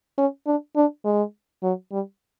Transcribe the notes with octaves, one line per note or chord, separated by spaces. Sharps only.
C#4
D4
D4
G#3
F#3
G3